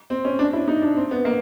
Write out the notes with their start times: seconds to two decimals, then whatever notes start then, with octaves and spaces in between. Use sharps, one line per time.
0.10 C4
0.25 C#4
0.39 D4
0.53 E4
0.68 D#4
0.82 D4
0.96 C4
1.11 B3
1.25 A#3